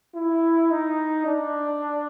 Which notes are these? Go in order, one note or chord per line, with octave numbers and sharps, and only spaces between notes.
E4
D#4
D4